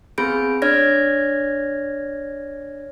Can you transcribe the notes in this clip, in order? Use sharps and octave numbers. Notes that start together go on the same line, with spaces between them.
B3 C4 G#4 B5 G6 D7
D4 C#5 D5 F6 G#6 A#6